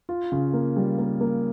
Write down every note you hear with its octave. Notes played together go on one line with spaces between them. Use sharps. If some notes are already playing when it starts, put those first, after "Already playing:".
F4
C#3
A#3
G3
A#3
A#3